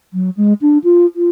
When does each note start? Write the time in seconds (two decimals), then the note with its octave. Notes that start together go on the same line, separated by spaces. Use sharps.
0.13 F#3
0.37 G#3
0.61 D4
0.84 F4
1.16 F4